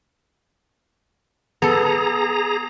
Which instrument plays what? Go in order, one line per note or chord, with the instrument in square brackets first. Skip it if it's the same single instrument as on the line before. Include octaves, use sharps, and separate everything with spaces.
[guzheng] B3 A4 [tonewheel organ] G#4 A#5